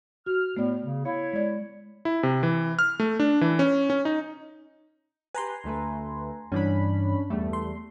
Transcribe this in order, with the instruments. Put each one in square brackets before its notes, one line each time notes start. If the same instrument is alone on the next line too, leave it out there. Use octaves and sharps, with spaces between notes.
[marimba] F#4 [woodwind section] F6
[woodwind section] A2 [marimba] A3 B3 D5
[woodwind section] C#3
[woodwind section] E4 C#5 [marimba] F5
[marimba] G#3 D5
[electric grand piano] E4
C3
E3
F6
A3
D4
E3
C#4
C#4
D#4
[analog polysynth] G4 B4 [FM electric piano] G#5 A#5 C6
[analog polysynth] D2 A3 B4
[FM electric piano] G2 E3 [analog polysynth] C#4 D4 B5
[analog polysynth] E2 G3 A3
[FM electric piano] C6